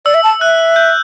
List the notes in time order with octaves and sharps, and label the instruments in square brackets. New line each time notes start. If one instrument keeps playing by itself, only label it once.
[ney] D5 [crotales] E6
[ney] E5
A5
[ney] E5 [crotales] F#6
[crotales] G6